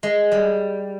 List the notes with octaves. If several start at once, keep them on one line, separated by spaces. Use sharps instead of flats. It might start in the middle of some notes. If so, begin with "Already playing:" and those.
G#3
G3